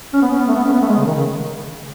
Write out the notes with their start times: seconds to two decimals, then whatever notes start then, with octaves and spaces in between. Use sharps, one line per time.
0.13 C#4
0.22 B3
0.30 C#4
0.39 B3
0.48 A3
0.55 B3
0.64 C#4
0.72 B3
0.81 A3
0.89 G#3
0.98 C#3
1.06 D#3
1.15 C#3